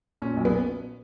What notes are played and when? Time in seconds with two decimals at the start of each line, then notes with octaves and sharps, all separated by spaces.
0.22 A#2 C#4
0.37 B1
0.45 B3